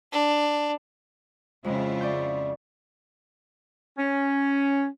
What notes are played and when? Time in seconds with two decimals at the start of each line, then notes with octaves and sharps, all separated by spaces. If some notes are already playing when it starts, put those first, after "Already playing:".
0.12 D4
1.64 F2 C#3 G#3 E4 F4
2.01 D5 C#6 G6
3.98 C#4